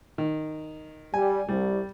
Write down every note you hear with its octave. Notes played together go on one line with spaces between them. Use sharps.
D#3
G3 G#5
C2 G3